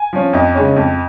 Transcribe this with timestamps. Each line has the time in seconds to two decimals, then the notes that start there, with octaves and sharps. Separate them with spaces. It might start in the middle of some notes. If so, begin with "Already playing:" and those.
Already playing: G#5
0.13 F3 C#4
0.33 F2 D#5
0.55 C#3 G#3 C#4
0.76 F2